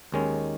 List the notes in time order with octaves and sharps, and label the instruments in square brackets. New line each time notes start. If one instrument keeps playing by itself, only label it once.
[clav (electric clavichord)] D#2 D#3 G#3 C#4